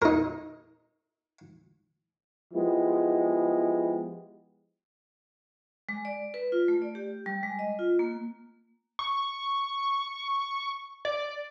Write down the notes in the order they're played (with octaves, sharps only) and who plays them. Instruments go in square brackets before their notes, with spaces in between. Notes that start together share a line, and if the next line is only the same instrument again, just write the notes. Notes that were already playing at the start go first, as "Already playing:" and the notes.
[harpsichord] D#4 A#4
[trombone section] F3 G#3 B3 E4 G4
[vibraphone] G#3
D5
B4
F4
A3
D5
G4
G3
G#3
D#5
F4
A#3
[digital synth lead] C#6
D5